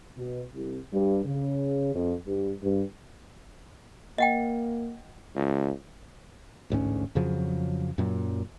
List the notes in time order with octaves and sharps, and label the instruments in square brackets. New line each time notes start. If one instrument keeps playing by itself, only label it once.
[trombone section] B2
C2
G2
C#3
F2
G2
G2
[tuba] A#3 [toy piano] D#5 F#5 G5
[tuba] C#2
[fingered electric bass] A1 D2 G#2 C#4
F2 C#3 F3 F#3
F#2 A#2 F#3